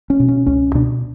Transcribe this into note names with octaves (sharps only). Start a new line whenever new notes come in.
C#4
B2
C#4
C#2 C#4
B2 D4